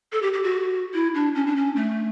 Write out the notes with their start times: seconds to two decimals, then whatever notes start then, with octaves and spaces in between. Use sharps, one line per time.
0.12 A4
0.22 G4
0.33 G4
0.44 F#4
0.94 E4
1.15 D4
1.35 C#4
1.46 D4
1.56 C#4
1.76 A3